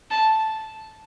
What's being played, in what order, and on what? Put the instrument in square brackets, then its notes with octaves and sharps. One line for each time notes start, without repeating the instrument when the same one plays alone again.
[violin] A5